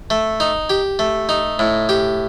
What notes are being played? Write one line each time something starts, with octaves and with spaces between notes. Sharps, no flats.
A3
D#4
G4
A3
D#4
A2
G4